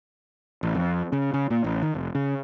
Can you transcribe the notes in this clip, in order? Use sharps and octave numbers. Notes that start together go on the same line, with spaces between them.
A1
F2
C#3
C#3
A#2
A1
D#3
F1
C#3